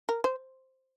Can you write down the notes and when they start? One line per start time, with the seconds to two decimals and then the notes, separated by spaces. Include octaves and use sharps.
0.09 A#4
0.24 C5